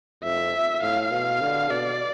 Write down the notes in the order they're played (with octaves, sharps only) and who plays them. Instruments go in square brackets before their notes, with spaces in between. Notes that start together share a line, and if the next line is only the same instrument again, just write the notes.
[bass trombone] F2 [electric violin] E5
[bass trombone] A2 [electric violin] F5
[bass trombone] B2
D3
[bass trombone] B2 [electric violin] D5